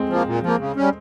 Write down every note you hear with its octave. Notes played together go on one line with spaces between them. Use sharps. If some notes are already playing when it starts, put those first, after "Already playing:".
Already playing: G#3 C4
F3 A#3
A#2
F3 A#3
C#3
G3 C#4